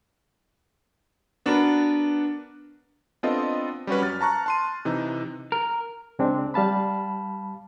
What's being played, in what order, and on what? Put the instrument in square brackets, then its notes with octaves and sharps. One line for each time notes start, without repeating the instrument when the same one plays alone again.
[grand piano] B3 D4 F#4 A#4 B4
[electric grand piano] B3 C4 D4 F4 A4 D#5
G3 C#4 F#4 B4
F#2 F6 A6
A5 A#5 C#6 F#6
A5 C6 D#7
C3 E3 D#4
[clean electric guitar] A#4
[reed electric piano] C#2 G#3 C4 D4
G3 F5 A5 B5